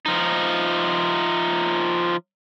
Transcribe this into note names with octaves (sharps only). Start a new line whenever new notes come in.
F3 D#4